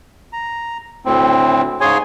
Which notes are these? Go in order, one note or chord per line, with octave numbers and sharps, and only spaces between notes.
A#5
D2 A2 C4
G#2 C#3 G#4 C#5 G#5 C6